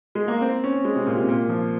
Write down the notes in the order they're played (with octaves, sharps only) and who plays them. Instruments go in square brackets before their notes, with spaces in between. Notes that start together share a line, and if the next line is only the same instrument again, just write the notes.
[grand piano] G#3
A#3
C4
C#4
G#3
C3
A#2
C3
A#2
F3